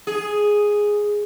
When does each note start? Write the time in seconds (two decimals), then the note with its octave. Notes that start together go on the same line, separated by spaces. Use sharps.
0.07 G#4